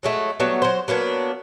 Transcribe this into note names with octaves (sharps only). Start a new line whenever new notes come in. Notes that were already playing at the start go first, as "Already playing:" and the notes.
F#3 G#3 A3
F#3 G3 A3 B3
F#3 C5
F#3 A#3 B3 D4